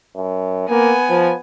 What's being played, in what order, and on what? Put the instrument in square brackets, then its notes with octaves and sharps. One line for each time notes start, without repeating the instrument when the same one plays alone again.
[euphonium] F#2
[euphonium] A#3 [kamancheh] B3 G#5
[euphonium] F3